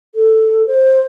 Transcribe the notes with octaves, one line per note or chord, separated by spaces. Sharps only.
A4
C5